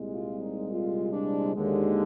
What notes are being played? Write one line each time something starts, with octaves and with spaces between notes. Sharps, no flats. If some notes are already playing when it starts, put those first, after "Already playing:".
Already playing: C2 A#2 G#3
F4
D#4
F4
D4
D#2 D3 G#3